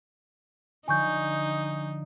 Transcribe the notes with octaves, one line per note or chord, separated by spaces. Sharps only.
D3 F3 D#4 G#5 C#6 G6